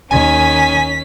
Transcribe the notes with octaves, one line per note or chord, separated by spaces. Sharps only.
D#2 D#3 C#4 G#5 B6